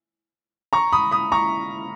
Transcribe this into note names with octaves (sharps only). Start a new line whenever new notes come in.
A#5 C#6
B5 D#6
B5 D#6
A#5 C#6